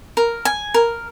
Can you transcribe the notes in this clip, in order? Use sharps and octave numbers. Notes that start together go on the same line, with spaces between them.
A#4
G#5
A#4